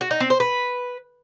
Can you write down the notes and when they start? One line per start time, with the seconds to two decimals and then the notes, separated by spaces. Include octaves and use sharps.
0.01 F#4
0.11 D#4
0.20 C4
0.30 C5
0.40 B4